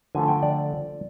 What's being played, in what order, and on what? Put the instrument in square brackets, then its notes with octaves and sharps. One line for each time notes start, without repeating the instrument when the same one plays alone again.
[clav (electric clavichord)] D3 F3 A3 G#5
G5
D5